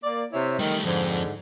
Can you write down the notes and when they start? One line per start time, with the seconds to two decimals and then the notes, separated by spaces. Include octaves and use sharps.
0.04 A#3 D5
0.33 C3 E4 C#5
0.59 D#3 G3 A3
0.84 F2 G#2 D3